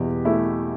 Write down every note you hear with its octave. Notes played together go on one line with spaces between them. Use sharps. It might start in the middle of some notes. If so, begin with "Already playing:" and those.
Already playing: E2 B2 G4
A3 E4